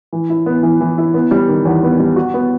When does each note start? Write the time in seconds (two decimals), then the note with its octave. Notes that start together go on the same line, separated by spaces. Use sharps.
0.13 E3
0.30 E4
0.46 B3
0.63 E3
0.81 E3
0.98 E4
1.14 B3
1.31 G3
1.49 D#3
1.65 E2
1.83 B3
1.99 G3
2.16 F#4
2.34 B3